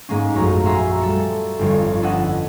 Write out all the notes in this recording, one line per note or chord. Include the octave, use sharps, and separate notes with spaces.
G#2 G#3 A#3 C#4
A#1 F#2 A3 C#5 A#5 C#6
E5 F#5 G#5 A#5 C6 C#6
G3 A4 C#7
G1 F2 C#5
C#4 D4 A4 B4 D#5 F#5